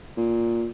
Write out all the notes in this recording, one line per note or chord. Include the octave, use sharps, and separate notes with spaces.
A#2